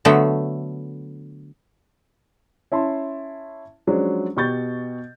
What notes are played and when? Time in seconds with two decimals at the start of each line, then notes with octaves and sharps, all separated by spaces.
0.05 D3 F#3 A3 B3
2.72 C#4 E4 A5 C6
3.87 F3 F#3 G#3 C#4 D4
4.37 B2 G4 C#6 G6 A6